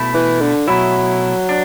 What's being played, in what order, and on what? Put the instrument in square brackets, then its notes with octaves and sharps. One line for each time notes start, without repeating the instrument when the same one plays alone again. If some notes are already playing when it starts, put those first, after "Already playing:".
Already playing: [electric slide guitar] B2 A3 E4
[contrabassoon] E3
D3
[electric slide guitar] B2 A3 E4 [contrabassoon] F#3
[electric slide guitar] D4